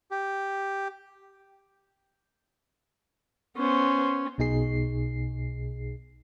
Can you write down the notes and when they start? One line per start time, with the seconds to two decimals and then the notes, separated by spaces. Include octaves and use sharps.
0.11 G4
3.57 B3 C#4 C5
4.38 B1 B2 D#4 G#4 C7